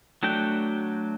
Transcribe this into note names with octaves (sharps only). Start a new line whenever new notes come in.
F#3 A3 D4 F#4 G5